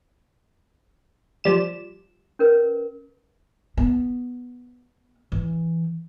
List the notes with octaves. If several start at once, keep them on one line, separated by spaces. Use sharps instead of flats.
F3 G3 E7
C#4 A#4 B4
B3
E3